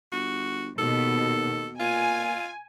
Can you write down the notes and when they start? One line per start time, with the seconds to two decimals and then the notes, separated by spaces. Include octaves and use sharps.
0.12 G1 F#4
0.78 D#2 B2 A4
1.80 A#2 F4 G#5